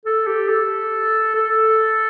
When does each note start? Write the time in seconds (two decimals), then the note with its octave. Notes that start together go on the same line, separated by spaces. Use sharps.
0.05 A4
0.27 G4
0.49 A4
1.35 A4